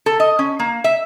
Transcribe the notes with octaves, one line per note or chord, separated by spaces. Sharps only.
A4
D#5
C#4
A#3
E5